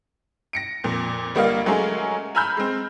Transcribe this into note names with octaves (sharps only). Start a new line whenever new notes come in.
A#6 C#7 D7
F2 A#2
G1 G3 A#3 D#5 F5
F#3 G#3 A3 C#4 G#4 A#4
G#5 A#5 B5 E6 F6 G6
G#3 C4